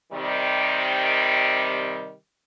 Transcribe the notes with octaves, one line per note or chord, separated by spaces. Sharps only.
C3 D#3 G3